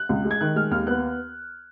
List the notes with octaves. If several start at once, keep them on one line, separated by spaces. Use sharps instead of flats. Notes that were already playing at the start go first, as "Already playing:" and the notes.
Already playing: F#6
C#2
G#3
G#6
D#3 F#6
G#3 F6
D#2 F6
B3 F#6